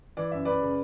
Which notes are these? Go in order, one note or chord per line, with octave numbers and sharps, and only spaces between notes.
E3 D5
F#2 E5
F#2 B4 D5
C#3